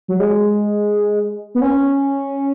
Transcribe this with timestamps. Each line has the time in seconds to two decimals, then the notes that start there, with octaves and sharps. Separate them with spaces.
0.08 F#3
0.20 G#3
1.55 B3
1.62 C#4